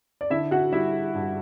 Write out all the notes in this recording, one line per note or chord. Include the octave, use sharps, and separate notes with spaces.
D5
D3 E4 E5
F#4 F#5
G3 E4 E5
G2